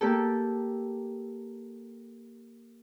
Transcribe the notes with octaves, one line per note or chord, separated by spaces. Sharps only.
A#3 G4 A4